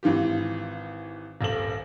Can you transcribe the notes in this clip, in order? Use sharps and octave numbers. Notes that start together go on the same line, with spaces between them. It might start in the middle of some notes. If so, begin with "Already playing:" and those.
G#1 E3 F4 G4
D#1 A#1 A4 F#7